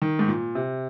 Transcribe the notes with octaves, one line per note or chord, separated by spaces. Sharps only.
D#3
G#2
A#2
C3